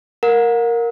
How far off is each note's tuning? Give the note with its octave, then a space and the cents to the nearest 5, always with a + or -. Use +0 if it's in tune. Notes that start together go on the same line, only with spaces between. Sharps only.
A#4 +0 F#5 -45